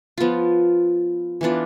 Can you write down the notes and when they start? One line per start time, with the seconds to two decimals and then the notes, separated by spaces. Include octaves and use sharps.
0.18 F3 B3 F4
1.41 E3 B3 D4 F4